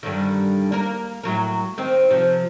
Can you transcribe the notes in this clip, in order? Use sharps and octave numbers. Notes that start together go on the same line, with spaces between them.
G2 D3 D#3
A#3 A#4
A2 F#3 A#4
D#3 C4
C3 F3